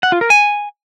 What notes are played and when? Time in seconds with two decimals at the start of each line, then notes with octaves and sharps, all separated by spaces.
0.03 F#5
0.12 F4
0.21 A#4
0.30 G#5